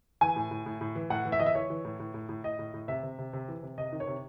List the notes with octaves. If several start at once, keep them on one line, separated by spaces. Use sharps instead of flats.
E3 G#5
A2
A2
A2
A2
E3
A2 F#5
E3
E5
E3 D#5
E5
E3 C#5
E3
A2
A2
A2
A2
A2 D#5
A2
A2
C3 E5
C3
C3
C3
E3
C3
C3 D#5
D#3
C#5
C3